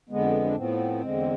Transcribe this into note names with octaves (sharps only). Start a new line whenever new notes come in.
F2 D3 G#3 B3
D4
A2 F3 B3 C4
E2 D3 G#3